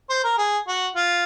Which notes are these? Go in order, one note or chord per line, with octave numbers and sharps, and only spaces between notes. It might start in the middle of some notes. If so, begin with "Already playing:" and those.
C5
A#4
G#4
F#4
F4